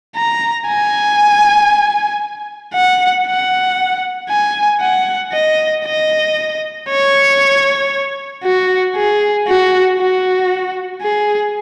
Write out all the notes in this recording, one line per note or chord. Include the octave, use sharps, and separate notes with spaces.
A#5
G#5
F#5
F#5
G#5
F#5
D#5
D#5
C#5
F#4
G#4
F#4
F#4
G#4